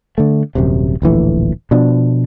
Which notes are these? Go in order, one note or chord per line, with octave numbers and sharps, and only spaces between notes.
D3 A3
D#1 F#2 C3
D1 A#1 E3 A3
B2 F3 D4